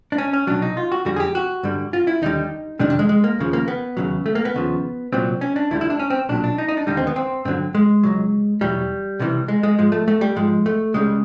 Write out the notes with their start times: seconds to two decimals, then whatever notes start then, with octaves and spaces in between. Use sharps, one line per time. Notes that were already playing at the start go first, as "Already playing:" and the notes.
0.12 D4
0.18 C#4
0.33 C#4
0.47 C2 B2 F#3 D4
0.62 D#4
0.77 F4
0.92 F#4
1.05 F2 D3 G3 F#4
1.16 G#4
1.20 G4
1.35 F#4
1.63 G2 D3 G3
1.93 F4
2.07 E4
2.22 D#2 D3 G3 D#4
2.79 F2 C3 D#3 G3 D4
2.90 D4
2.99 G#3
3.09 G#3
3.24 A#3
3.39 D#2 C#3 F3
3.53 A#3
3.68 B3
3.97 D#2 C#3 F#3
4.26 A3
4.35 A#3
4.45 B3
4.54 D#2 C#3 F3
5.13 C2 A#2 F#3 C4
5.41 C#4
5.56 D4
5.71 D2 D3 G3 E4
5.81 E4
5.90 D4
5.99 C#4
6.10 C4
6.29 B1 A#2 F#3 D4
6.44 D4
6.58 D#4
6.68 D#4
6.77 D4
6.87 D#2 D3 G3 D#4
6.97 C4
7.07 B3
7.16 C4
7.45 G2 D3 F#3 C4
7.75 G#3
8.03 C#2 B2 F#3
8.61 E2 B2 F#3 G3
9.19 C2 C3 E3 G3
9.48 G#3
9.63 G#3
9.78 G#2 F3 G#3
9.92 A3
10.08 A3
10.21 G3
10.36 G#2 F3 G#3
10.66 A3
10.94 C#2 C#3 E3 G3 G#3